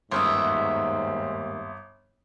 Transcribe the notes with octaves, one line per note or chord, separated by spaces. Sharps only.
G1 D#2 G#2 B3 C#4 E5 C6 D#6